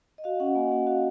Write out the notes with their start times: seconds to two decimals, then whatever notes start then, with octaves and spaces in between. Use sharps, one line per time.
0.18 D#5
0.24 F#4 F5
0.40 C#4 F#5
0.55 A#3 G#5
0.71 A#3 F#5
0.87 F#4 F5